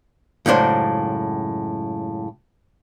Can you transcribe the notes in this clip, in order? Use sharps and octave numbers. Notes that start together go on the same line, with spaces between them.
C#2 F#2 A2 D4 C5